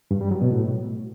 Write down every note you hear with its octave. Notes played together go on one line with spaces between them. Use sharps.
G2
G3
F#3
B2
A2